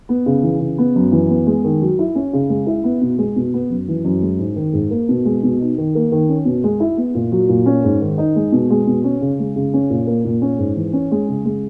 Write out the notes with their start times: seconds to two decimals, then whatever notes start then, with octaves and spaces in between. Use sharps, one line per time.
0.09 B3
0.26 C#3
0.43 E3
0.60 C#3
0.78 B3
0.96 F#2
1.12 E3
1.29 B3
1.47 G#3
1.64 D#3
1.82 F#3
1.99 E4
2.15 C#4
2.33 C#3
2.49 G#3
2.67 E4
2.84 B3
3.02 B2
3.18 G#3
3.36 B2
3.54 B3
3.70 F#2
3.88 E3
4.05 F#2
4.22 G#3
4.39 G#2
4.56 D#3
4.73 G#2
4.91 A#3
5.09 B2
5.25 G#3
5.43 B2
5.60 D#4
5.78 D#3
5.95 A#3
6.12 D#3
6.29 C#4
6.45 B2
6.64 G#3
6.80 E4
6.97 B3
7.15 A#2
7.32 F#3
7.49 A#2
7.66 C#4
7.84 G#2
8.01 D#3
8.18 D#4
8.36 G#3
8.52 B2
8.70 G#3
8.87 B2
9.04 C#4
9.21 C#3
9.39 G#3
9.56 C#3
9.74 C#4
9.90 A#2
10.07 A#3
10.25 A#2
10.42 C#4
10.59 G#2
10.76 E3
10.93 C#4
11.11 G#3
11.29 C#3
11.45 G#3